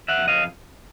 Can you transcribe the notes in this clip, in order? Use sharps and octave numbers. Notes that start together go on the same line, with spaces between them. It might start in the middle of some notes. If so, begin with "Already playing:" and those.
E5 F#5
F2
D#5 F5